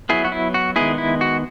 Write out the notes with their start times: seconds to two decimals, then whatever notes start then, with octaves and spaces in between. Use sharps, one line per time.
0.09 F#3 B3 E4 G#4
0.25 F#4
0.32 E4
0.54 F#4
0.76 D#3 G#3 B3 E4 G#4
0.98 E4
1.21 F#4